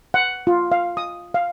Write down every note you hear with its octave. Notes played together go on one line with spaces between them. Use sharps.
F#5
F4
F5
D#6
F5